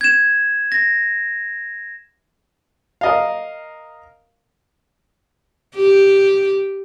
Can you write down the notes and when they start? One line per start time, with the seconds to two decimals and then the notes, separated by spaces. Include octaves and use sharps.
0.01 G#6 E7
0.72 A#6
3.01 A#4 D#5 F5
5.76 G4